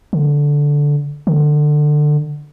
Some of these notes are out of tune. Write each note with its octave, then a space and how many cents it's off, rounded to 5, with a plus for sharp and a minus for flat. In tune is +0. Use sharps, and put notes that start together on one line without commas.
D3 -10
D3 +20